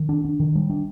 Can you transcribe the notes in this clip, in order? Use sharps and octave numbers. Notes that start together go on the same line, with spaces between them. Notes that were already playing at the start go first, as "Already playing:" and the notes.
Already playing: D#3
D4
D4
D#3
G3
D4